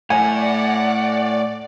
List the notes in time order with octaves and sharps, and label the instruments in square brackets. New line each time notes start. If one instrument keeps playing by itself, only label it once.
[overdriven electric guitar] A2 [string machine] D5 [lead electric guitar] F#5 [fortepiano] G#5